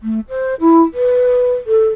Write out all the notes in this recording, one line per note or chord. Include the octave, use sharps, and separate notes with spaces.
A3
C5
E4
B4
A4